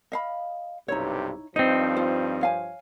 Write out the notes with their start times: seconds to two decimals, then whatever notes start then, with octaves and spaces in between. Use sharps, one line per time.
0.12 D#5 F5 B5
0.88 B1 G2 C3 D#4 E4 C#5
1.56 G2 F3 C4 D#4 D#5
1.97 F4 C5
2.41 C#5 F5 G#5